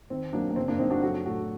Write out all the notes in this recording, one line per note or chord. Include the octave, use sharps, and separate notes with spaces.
D#3 C4
F#3 A#3 D4
A#3
F#1 C4
A#3 D4
F#1 C4 D#4
D4 F#4
F#3 F#4 A4
A2 F#4 A4